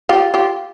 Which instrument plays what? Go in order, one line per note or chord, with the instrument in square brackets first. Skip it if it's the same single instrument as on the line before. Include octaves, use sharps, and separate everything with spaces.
[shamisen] F4 G4
F4 G4